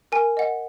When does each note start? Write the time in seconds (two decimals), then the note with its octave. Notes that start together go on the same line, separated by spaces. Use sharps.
0.12 A#4 G#5
0.37 D#5 F#5